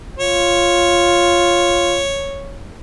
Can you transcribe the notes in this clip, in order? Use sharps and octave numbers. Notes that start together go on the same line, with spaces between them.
F4 C#5